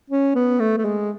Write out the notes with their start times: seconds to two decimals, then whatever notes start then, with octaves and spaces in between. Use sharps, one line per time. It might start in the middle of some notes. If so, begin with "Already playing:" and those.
0.10 C#4
0.35 B3
0.60 A3
0.78 A3
0.85 G#3